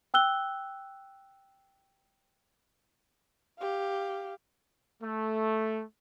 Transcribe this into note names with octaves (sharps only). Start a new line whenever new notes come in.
G5 E6 F#6 G7
G4 F5
A3